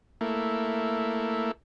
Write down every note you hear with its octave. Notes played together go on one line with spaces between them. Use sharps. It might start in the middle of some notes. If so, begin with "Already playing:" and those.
A3 A#3 E4